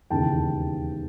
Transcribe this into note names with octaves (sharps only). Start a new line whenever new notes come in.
E1 D#2 C#3 E3 G5 A5